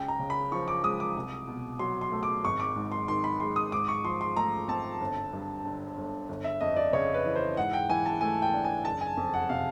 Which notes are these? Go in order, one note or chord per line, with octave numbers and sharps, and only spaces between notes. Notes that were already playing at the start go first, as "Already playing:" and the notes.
Already playing: C#2 G5
A#5
C#3
B5
F3 C#6
D6
G#3 D#6
D6
C2
B2
F#3 C6
C6
A3
D6
G#1 C#6
D6
G#2
C6
D#3 C6
B5
G#3 C6
D#6
G#2 D6
C#6
F3 C6
C6
A3 A#5
C4 A5
G1
G2
D3
G1
G1
E5
F2 D#5
D5
C#3 C#5
B4
E3
C5
G#2 F#5
G5
E3 G#5
A5
A3 G#5
G5
D4
G#5
F#1 A5
G#5
F2
F#5
C3 F5